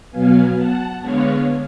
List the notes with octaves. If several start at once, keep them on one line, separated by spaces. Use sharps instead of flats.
B2 F#3 B3 F5 G#5
F#5 A5
D3 G#3 B3 C#5 F5